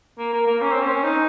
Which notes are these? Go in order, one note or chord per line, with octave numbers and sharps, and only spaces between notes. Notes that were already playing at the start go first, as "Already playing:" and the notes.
A#3
A#3
A#3
C#4
C4
C#4
D#4